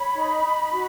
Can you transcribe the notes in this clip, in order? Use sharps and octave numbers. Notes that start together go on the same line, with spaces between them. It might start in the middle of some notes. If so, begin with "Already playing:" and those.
Already playing: C#5 B5
D#4
D#4
F#4